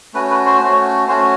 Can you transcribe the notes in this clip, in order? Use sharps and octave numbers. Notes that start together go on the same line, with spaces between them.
A3 C#4 F#4 B4
B4
C5
A3 C#4 F#4
A3 C#4 F#4 C5